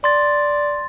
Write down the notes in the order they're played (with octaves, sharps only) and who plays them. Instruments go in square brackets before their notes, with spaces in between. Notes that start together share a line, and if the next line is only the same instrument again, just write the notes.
[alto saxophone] D5 [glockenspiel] C6 A6